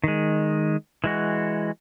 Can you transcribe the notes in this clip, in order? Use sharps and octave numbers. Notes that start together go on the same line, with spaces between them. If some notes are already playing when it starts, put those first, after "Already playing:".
D#3 G#3
E3 G#3 F#4